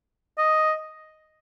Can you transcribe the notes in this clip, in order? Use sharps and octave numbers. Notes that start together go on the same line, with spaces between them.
D#5